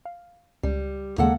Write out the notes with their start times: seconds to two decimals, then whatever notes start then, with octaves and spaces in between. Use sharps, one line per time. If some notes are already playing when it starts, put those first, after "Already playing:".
0.05 F5
0.63 C#2 G3
1.18 D#2 C#3 G#3 A#3 A4 F#5